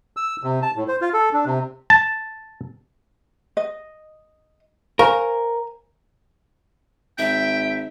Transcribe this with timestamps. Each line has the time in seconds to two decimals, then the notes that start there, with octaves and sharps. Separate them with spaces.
0.17 E6
0.43 C3
0.62 A5
0.76 A2
0.88 C5
1.01 F4
1.13 A4
1.33 D4
1.46 C3
1.90 A5
3.57 D#5
4.99 A#4 C5 F5 G#5 C#6
7.18 G#1 E5 G5